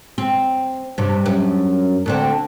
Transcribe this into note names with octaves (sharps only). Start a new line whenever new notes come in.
C4
G2 C3
F#2
D2 D3 C4